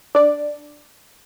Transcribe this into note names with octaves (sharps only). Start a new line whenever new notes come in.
D4 D5